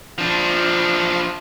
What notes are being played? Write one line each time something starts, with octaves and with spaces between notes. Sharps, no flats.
F3 D4